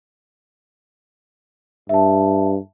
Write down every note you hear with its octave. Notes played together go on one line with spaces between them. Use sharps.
G2 E5 A5